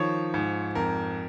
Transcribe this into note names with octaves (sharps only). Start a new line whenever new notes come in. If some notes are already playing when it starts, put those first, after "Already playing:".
Already playing: D#3 F3 C#5
G#2
F2 A#4